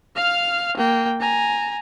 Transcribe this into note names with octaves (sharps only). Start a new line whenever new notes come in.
F5 F6
A#3 G5
G#5 A#5